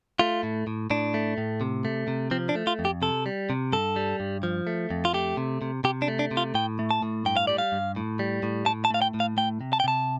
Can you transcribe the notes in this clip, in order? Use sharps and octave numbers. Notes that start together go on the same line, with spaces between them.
A3 F4
A2
A2
A2 D4
A3
A2
C3
A3
C3
F3 C4
D4
A3
F4
F2
G4
C3 A4
G3
C3
G2 A4
G3
G2
F3
A3
F2
F4
A3 G4
C3
C3
C3 G4
D4
A3
D4
C3
F4
A2 G5
A3
A5
A2
G2 G5
F5
G3 D5
F5
G2
A2
G3
A2
A2 A5
A5
A3 F5
G5
A2
F5
A3 G5
C3
A5
G5
C3 A5